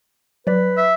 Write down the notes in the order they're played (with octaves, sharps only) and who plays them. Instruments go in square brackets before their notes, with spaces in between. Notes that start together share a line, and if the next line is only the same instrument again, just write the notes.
[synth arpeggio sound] F#3 D5 [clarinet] B4
[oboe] E5